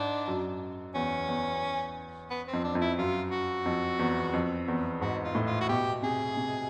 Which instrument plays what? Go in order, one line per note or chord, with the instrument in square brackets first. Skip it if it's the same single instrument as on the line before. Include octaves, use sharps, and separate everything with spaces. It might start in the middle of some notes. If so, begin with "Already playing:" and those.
Already playing: [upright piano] G#2 [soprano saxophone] D4
[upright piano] F#2
[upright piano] E2 [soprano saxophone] C#4
[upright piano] E2
[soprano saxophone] B3
C4
[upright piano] F2
[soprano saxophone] D4
[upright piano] F2
[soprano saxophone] E4
[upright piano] F#2 [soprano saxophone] F4
[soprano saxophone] F#4
[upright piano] F2
E2
F2
E2
[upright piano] G#2 [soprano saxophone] F#4
[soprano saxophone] F4
[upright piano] A2
[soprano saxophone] F4
F#4
[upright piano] B2 [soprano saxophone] G4
[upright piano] C3 [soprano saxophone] G#4
[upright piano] C3